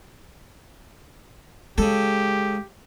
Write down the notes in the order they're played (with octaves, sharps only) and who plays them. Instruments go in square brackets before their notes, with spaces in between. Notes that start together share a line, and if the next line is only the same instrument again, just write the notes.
[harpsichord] C#3 A4 [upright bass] G#3 [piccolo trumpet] G4